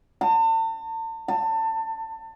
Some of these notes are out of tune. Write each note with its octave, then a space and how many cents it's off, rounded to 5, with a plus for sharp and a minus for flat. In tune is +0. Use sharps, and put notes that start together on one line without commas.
A5 +40
A5 +25